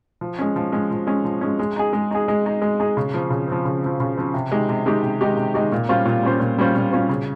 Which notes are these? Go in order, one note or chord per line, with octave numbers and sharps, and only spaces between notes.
F3
G#3 C#4
F3
G#3 C#4
F3
G#3 C#4
F3
G#3 C#4
G#3
D#4 G#4
G#3
D#4 G#4
G#3
D#4 G#4
G#3
D#4 G#4
C#3
F3 C4
C#3
F3 C4
C#3
F3 C4
C#3
F3 C4
C3
D#3 G#3 D#4 G4
C3
D#3 G#3 D#4 G4
C3
D#3 G#3 D#4 G4
C3
D#3 G#3 D#4 G4
A#2
G3 C#4 F4 C5
A#2
G3 C#4 F4 C5
A#2
G3 C#4 F4 C5
A#2
G3 C#4 F4 C5
C#3